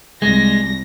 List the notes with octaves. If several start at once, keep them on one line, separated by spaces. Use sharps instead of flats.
C2 G#3 A#6